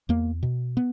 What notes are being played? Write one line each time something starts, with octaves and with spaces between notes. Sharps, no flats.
E2 A#3
B2
B3